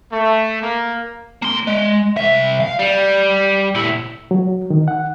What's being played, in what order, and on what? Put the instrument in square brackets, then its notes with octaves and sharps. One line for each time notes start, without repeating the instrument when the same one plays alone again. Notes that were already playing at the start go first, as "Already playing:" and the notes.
[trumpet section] A3
A#3
[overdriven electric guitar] A#3 C6
G#3
C2 E5
F5
G3
A#2 E4
[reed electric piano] F#3
D#3
F#5